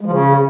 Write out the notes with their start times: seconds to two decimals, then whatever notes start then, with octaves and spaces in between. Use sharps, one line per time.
0.01 G#3
0.06 F3
0.12 C#3